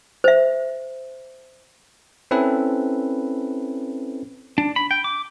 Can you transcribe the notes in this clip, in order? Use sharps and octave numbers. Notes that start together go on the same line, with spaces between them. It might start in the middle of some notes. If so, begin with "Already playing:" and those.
C5 E5
C4 C#4 E4 A4 B4
D4
B5
G5
D6